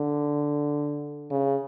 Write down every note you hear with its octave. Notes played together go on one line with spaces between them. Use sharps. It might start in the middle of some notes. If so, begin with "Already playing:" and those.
Already playing: D3
C#3